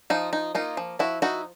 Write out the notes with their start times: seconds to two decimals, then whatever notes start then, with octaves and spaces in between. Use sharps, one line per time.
0.10 F3 D#4 F4
0.33 D#4
0.55 A#3 D#4 F4
0.77 F3
0.99 F3 E4 F#4
1.22 D#4 E4 F#4